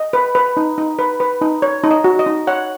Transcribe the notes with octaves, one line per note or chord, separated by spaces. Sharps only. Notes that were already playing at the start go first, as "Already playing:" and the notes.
Already playing: D#5
B4
B4
D#4
D#4
B4
B4
D#4
C#5
D#4
D#5
F#4
D#5
D#4
C#5 F#5